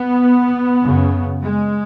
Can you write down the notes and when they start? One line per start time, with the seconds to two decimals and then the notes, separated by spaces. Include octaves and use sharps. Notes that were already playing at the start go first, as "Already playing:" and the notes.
Already playing: B3
0.81 F#2 C#3
1.43 G#3